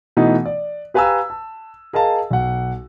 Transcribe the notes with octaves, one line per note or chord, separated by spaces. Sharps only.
B2 E3 A3 B3 D#4
D5
G4 B4 F5 G#5 A#5 E6
A5
G#4 A#4 D#5 F5 A5
B1 F#5